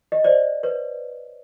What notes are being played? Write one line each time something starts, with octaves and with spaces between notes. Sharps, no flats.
D#5
C5 D5
B4 C#5